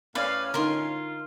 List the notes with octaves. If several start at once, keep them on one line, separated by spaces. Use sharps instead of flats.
A2 C#4 B4 D5 F5
D3 D#4 F4 A#4 C6